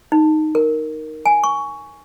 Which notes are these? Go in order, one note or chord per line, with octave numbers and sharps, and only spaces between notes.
D#4
A#4
G#5
C#6